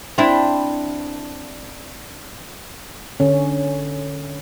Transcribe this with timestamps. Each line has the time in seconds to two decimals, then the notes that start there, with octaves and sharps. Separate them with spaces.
0.18 C4 D4 E4
3.20 D3 C#4